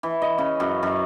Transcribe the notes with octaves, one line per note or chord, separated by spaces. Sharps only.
E3
D#5
C#3
F#2
F#2